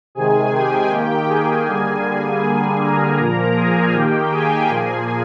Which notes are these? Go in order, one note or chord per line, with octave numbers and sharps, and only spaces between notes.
C3 D#3 G#3 G#4 G#5
G4 G5
D#3 A#3
G#4 G#5
D3 G3 A#3 G#4 G#5
D3 G3 A#3 G#4 G#5
A#4 A#5
A#2 F3 A#3
G#4 G#5
D#3 A#3 G4 G5
G#4 G#5
A#2 F3 A#3 G#4 G#5